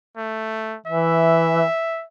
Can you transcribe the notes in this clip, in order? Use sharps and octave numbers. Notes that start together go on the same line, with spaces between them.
A3
E3 E5